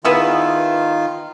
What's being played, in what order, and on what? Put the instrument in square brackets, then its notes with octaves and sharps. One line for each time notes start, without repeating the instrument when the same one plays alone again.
[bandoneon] D#3 F4 [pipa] B3 E4 G#4